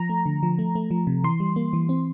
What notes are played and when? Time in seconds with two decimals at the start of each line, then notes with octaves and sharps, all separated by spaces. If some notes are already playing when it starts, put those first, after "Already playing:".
Already playing: F3 A#5
0.09 A3
0.26 D3
0.43 F3
0.59 A3
0.75 A3
0.91 F3
1.07 C3
1.24 E3 C6
1.40 G3
1.56 A#3
1.73 E3
1.89 C4